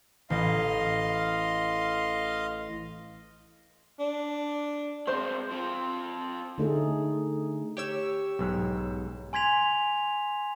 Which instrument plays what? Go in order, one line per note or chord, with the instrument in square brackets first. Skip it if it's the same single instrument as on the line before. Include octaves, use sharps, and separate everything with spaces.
[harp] A1 [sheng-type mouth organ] D#5 F5 C6
[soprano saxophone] D4
[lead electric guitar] G#3 C4 [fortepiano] C5 C6
[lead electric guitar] F3 C4
[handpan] D3 A3 D#4 G#4
[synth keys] G4 C#5 E6
[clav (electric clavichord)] B1 G#2
[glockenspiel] G#5 C6 G#6 B6 F7